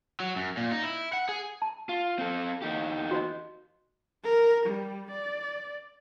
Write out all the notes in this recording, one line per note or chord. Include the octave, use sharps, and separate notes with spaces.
F#3
F#2
A#2
D#4
E4
F#5
G#4
A5
F4
C4 A4
E2 D#4 G4
F#4 C5 D#5
A#4
G3
D5